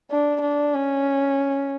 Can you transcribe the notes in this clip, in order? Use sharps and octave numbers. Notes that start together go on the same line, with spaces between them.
D4
D4
C#4